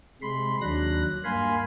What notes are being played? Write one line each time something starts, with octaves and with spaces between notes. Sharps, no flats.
C3 G#3 B5 C6
D#2 F#3 D4 F#6 A#6
G2 A#3 F5 G#5 B5 C6